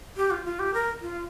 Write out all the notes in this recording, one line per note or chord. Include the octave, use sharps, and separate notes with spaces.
G4
F4
F4
G4
A#4
F4